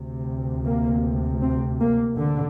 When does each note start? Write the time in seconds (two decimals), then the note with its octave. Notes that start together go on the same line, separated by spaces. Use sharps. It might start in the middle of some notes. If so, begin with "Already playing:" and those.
Already playing: D2 C3
0.64 A#3
1.42 C4
1.80 A#3
2.18 D3